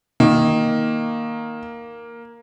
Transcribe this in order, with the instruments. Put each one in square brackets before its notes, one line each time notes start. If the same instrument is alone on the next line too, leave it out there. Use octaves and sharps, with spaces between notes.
[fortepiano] D#3 [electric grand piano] A#3